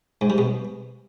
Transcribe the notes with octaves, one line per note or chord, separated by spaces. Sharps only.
G#2
G3
B2